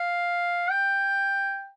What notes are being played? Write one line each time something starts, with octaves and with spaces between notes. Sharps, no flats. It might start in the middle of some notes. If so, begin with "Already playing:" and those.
Already playing: F5
G5